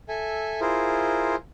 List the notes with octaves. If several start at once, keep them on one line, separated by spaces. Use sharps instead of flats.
A4 E5 G#5
E4 F4 G#4 A#4 C5